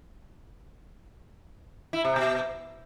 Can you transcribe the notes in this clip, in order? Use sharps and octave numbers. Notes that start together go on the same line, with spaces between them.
E4
C3
B2